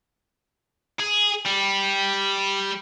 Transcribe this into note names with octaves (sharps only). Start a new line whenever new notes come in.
G#4
G3